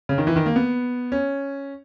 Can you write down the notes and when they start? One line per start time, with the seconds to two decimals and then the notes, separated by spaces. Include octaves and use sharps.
0.09 C#3
0.18 D#3
0.27 E3
0.36 D#3
0.46 A#3
0.56 B3
1.12 C#4